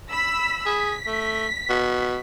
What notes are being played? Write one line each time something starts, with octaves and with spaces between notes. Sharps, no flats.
B5 E6 B6
G#4 B6
A3
B2